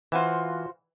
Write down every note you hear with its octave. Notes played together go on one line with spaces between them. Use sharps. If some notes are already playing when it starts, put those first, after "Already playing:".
E3 F4 F#4 C5